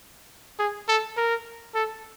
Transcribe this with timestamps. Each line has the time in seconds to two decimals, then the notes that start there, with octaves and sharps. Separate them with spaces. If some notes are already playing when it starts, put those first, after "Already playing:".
0.59 G#4
0.88 A4
1.17 A#4
1.75 A4